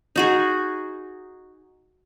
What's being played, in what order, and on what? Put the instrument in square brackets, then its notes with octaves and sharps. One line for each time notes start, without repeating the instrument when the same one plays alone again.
[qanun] D#4 F#4 G#4